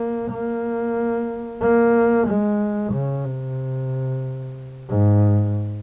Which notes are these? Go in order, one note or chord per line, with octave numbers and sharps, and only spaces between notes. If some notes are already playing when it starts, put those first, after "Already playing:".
Already playing: A#3
A#3
A#3
G#3
C#3
C3
G#2